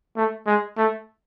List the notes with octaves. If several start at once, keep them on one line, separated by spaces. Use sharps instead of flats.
A3
G#3
A3